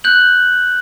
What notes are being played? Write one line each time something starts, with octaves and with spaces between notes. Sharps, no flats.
F#6 G6 F#7